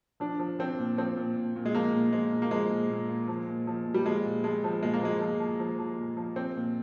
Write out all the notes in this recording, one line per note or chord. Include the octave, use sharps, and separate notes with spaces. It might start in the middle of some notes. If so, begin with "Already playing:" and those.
F3 D4
F3
F3 C4
A#2
F3 C4
A#2
A#2
A#2
G#3
F3 A#3
A#2
F3 G#3
A#2
A#3
F3 G#3
A#2
A#2
A#2
F3
A#2
F3
A#2
G3
F3 G#3
A#2
F3 G#3
F3
A#2 G#3
A#3
F3 G#3
F3
F3
F3
F3
A#2
F3
F3 C4
A#2